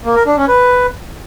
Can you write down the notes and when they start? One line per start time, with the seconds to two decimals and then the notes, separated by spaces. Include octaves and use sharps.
0.05 A#3
0.16 A#4
0.26 D4
0.37 C#4
0.48 B4